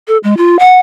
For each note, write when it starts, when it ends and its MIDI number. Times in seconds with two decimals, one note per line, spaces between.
0.08 0.17 69
0.24 0.37 56
0.37 0.59 65
0.59 0.80 78